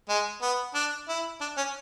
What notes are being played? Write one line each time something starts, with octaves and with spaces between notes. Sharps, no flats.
G#3
B3
D4
E4
D4
C#4